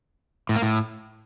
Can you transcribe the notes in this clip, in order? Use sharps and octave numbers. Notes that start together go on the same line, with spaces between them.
A2
A#3
A2